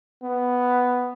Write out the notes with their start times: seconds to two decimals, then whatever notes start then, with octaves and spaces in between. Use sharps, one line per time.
0.23 B3